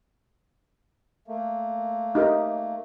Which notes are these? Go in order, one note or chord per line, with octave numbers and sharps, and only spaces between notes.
A3 A#3
D#4 G4 A#4